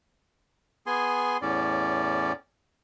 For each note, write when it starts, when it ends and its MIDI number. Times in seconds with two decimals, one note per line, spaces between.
0.87 1.37 59
0.87 1.37 68
0.87 1.37 80
0.87 1.37 84
1.42 2.32 40
1.42 2.32 45
1.42 2.32 61
1.42 2.32 74